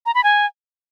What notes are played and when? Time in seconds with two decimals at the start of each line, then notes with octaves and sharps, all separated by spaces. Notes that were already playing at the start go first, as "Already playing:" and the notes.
0.06 A#5
0.15 B5
0.24 G#5